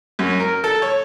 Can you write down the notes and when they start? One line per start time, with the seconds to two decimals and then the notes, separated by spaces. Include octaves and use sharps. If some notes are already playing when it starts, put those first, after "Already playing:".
0.19 F#2
0.40 A#4
0.64 A4
0.82 C#5